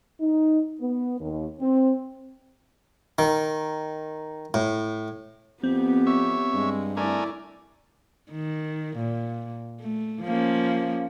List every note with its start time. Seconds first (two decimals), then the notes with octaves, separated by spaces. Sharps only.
0.21 D#4
0.80 B3
1.20 D#2
1.60 C4
3.19 D#3
4.54 A2
5.64 F2 B3 C4 G4
6.07 C#5 E5
6.54 G2 G#3
6.97 A3 E4 A#4 D5 G#5
8.31 D#3
8.97 A#2
9.81 A3
10.23 F3 A#3 C#4